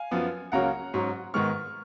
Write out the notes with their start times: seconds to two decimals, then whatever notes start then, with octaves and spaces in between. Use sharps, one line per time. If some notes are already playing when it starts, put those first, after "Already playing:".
Already playing: F5 G#5
0.11 F#2 F3 B3
0.52 C#2 C#3 F#3 A#3 C#4 F#5 A#5
0.94 G#2 F#3 C#4
1.34 G#2 D#3 G#3 B3 C#6 F6